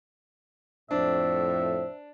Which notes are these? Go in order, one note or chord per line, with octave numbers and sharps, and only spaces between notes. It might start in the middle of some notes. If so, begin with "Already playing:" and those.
F2 A2 D4 C5 E5